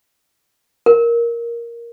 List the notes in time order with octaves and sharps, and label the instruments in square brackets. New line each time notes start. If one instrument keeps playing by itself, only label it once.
[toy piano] A#4